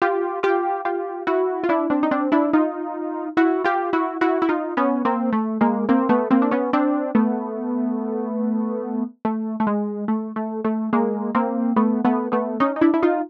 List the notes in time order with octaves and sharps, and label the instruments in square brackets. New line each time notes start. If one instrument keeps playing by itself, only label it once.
[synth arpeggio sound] F4 G4
F4 G4
F4 G4
E4 F#4
F4
D4 E4
C4 D4
D#4
C4 D4
D4 E4
D#4 F4
E4 F#4
F4 G4
E4 F#4
E4 F#4
E4
D#4 F4
B3 C#4
A#3 C4
A3
G#3 A#3
A#3 C4
A3 B3
A#3 C4
D4
B3 C#4
C4 D4
A3 B3
A3
A3
G#3
A3
A3
A3
G#3 A#3
A#3 C4
A3 B3
A3 B3
A3 B3
C#4 D#4
D#4
D4 E4
E4
D#4 F4